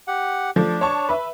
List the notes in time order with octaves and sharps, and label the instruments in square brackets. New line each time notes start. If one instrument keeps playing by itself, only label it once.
[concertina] G4 F#5
[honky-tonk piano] F3 A3 [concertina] D4
[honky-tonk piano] C#5 A5 C#6
B4 E5